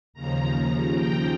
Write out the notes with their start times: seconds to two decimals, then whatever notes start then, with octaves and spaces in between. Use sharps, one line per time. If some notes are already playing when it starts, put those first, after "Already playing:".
0.13 D#2 C#3 F3 A#5
0.94 G5